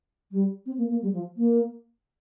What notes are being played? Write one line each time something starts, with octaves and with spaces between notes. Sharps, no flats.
G3
C4
A#3
A#3
G3
F3
A#3